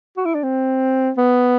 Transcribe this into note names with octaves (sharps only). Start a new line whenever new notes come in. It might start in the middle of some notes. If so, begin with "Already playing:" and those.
F#4
E4
D4
C4
B3